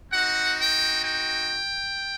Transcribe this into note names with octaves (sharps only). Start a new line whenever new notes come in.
C4 D#4 F#4 F#5
G5
G5